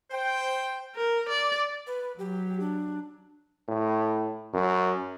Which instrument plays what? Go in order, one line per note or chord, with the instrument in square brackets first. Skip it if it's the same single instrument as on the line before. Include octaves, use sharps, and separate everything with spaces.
[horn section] C5 G5
[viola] A#4
D5
[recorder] B4
[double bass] F#3 [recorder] G4
[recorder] D4
[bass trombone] A2
F#2